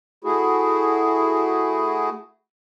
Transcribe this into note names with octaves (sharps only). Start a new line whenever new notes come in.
A3 E4 F#4 G#4